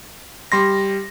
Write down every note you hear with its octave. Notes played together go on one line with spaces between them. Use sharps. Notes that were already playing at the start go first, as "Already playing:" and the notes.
G3 C6 A#6